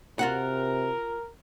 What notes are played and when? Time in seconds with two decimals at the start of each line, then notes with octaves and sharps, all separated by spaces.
0.19 C3 F4 F#4 A#4 F#5